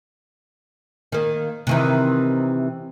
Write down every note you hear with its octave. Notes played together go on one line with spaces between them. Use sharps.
D#3 A#3
C3 D#3 E3